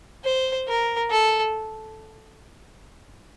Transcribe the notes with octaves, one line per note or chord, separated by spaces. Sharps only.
C5
A#4
A4